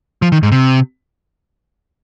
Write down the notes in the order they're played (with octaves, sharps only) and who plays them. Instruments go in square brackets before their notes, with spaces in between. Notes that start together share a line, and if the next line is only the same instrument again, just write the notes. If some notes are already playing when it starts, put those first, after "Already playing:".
[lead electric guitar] F3
D#3
G#2
C3